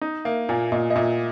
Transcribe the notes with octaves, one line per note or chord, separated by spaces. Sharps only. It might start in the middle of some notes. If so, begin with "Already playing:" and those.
D#4
A#3 E5
A#2 G#5
A#2 D#5
D#5
A#2 E5